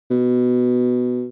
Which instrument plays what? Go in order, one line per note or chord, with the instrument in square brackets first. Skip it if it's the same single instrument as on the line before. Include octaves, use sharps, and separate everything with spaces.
[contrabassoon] B2